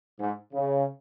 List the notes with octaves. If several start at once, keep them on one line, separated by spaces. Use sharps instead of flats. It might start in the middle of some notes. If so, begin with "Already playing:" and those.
G#2
C#3